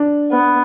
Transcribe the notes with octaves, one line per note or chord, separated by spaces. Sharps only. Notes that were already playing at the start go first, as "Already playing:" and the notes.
Already playing: D4
B3